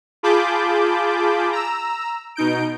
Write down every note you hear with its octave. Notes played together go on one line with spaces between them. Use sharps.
F4 G#4 A5 B5 D6 G6
A#5 E6
B2 D#4 G6 D7